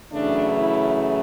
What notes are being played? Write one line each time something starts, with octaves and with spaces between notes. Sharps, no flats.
F#2 C#3 E3 A3 D4
E4